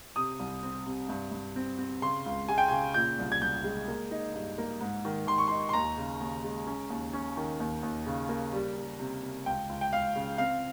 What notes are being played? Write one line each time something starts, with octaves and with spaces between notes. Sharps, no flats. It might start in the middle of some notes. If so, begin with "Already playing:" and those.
C3 D#6
C2
C4
C3
G2
G2
C4
C4
C#3 C6
C#2
G#3 G#5
G5
C#3 G#5
A#2 G6
C2
G#6
C2 G6
G#3
A#3
D#4
G2
A#3
G#2
D#3
D#3 C6
C#6
D#4 C6
C6
D#2 A#5
C#3
D#2
G#3
C#4
D#2
C#4
D#3
D#2
D#2
C#3
A#3
G3
G3
C3
C3
C#2 G5
C#2
G5
C#2 F5
C#3
C4 F5